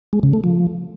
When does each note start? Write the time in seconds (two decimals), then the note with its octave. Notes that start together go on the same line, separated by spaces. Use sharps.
0.13 G#3
0.23 C#3
0.33 A3
0.44 F3